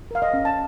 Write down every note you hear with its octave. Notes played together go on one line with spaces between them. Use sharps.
A#4 F5
D#5
C#4
A5